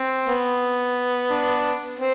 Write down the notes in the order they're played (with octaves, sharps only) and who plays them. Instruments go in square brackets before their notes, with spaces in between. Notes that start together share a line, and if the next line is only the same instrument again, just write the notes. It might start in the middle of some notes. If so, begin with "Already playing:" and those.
Already playing: [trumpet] C4
[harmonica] B3
[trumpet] D4
[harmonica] C4